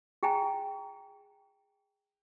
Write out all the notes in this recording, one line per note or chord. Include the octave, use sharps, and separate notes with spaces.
G#4 G5 G#5 A#5